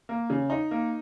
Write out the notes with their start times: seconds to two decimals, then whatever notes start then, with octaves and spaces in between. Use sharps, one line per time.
0.09 A#3
0.30 C#3
0.50 D#4
0.71 A#3